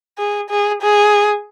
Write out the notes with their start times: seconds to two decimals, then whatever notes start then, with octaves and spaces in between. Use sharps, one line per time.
0.18 G#4
0.49 G#4
0.82 G#4